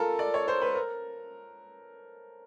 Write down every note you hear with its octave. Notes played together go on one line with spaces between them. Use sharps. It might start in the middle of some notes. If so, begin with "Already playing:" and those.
Already playing: F4 A4 A#4
D5
C#5
C5
B4
A#4